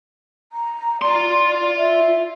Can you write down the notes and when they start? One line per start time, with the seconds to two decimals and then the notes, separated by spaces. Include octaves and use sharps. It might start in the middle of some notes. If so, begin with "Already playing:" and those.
0.52 A#5
1.02 F4 D5 C6
1.77 E5